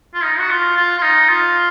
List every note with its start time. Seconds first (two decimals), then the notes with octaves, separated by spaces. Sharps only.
0.14 F4
0.24 D#4
0.38 F#4
0.50 F4
0.77 F4
0.98 F4
1.02 D#4
1.29 F4